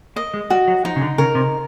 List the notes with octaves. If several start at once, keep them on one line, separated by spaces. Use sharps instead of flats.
A#3 D#5
G#3
G3 F#4
F#3
F3 D#4
C#3
D3
C#3 A#4
C3